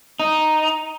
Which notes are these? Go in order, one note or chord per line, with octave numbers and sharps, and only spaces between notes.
D#4